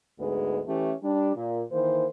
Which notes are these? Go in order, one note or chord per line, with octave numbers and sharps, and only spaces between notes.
D2 G#2 G#3 B3
E3 A3 C#4 G4
G3 D4
A#2
D#3 E3 A#3 C5